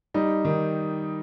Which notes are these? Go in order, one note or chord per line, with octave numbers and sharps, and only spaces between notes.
G3 D#4
D#3